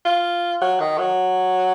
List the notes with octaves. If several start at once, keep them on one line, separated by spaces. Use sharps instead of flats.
F4
F#3
D#3
F#3